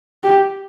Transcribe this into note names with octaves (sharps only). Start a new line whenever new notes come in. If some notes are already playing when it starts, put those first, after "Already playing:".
G4